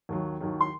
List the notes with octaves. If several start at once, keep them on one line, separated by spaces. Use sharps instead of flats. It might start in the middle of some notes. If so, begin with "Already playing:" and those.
D#2 D#3 F#3
D#2 D#3 F#3
C6